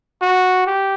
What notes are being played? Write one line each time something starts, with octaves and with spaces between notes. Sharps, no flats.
F#4
G4